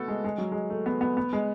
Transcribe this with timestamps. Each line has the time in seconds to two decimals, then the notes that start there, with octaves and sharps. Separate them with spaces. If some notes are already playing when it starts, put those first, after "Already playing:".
Already playing: A3 B3 F#4 A4
0.08 G#3
0.24 G#3
0.38 F#3
0.52 G#3
0.70 A3
0.86 B3
1.01 B3
1.17 B3
1.33 G#3